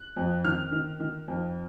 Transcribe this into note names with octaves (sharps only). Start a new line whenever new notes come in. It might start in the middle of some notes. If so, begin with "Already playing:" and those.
Already playing: F#6
F2
D#3 F6
D#3
D#3
F2